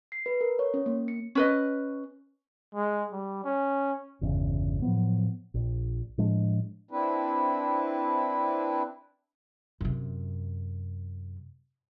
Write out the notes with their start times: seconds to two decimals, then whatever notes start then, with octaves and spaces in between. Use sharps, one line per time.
0.12 C7
0.26 B4
0.41 A#4
0.59 C#5
0.74 C#4
0.86 A#3
1.08 C#7
1.35 C#4 B4 D#5
2.75 G#3
3.12 G3
3.45 C#4
4.21 G1 E2 C#3
4.82 A2 F3 F#3 B3
5.54 A#1
6.18 A2 F3 G#3 D4
6.91 C4 D4 E4 B4
9.81 F#2 C3